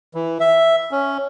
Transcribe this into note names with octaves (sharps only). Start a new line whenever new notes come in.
E3
E5
C#4